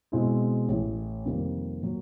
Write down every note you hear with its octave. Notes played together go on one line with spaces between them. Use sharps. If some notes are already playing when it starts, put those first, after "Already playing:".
B2 G#3 C4 E4
A1 A2 E3
F2 C3 D#3 G3 A#3
A#2 F#3